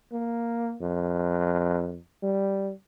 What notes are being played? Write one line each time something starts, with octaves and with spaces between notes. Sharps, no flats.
A#3
F2
G3